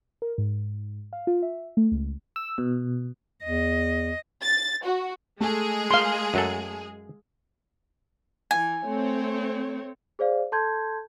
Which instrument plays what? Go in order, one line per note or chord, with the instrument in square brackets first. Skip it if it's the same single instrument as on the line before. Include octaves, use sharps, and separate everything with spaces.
[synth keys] A#4
G#2
F5
F4
E5
A3
C#2
[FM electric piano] E6
B2
[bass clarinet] E2 [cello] D#5
[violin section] A6
F#4
[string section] G#3 G#4 [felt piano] A3
[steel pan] F5 C6
[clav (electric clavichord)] F#2 F#3 A4
[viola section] E3 [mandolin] G#5
[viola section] A3 C4 C#5
[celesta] G#4 C5 D5 F5
A4 A5 C6 G6 G#6